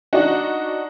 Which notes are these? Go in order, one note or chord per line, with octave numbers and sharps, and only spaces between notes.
D4 D#4 F#4